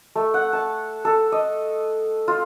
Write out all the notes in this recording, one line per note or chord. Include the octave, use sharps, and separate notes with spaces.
A3
F#5
A5
A4
D#5
F4